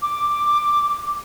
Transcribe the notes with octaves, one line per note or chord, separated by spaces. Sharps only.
D6